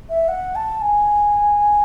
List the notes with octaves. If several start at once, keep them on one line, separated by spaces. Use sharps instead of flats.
E5
F#5
A5
G#5